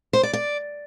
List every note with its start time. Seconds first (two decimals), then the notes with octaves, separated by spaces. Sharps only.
0.13 C5
0.23 D5
0.33 D5